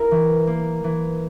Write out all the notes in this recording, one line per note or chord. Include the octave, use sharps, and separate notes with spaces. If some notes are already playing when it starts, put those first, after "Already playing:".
Already playing: E4 A#4
E3
A#3
E3